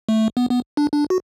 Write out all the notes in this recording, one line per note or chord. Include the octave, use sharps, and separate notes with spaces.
A3
B3
B3
D4
D4
F#4